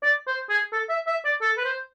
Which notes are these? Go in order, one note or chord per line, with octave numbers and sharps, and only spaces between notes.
D5
C5
G#4
A4
E5
E5
D5
A4
B4
C5